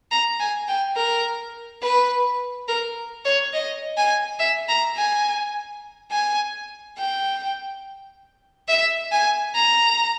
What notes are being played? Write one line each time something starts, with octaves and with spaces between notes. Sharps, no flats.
A#5
G#5
G5
A#4
B4
A#4
C#5
D#5
G#5
E5
A#5
G#5
G#5
G5
E5
G#5
A#5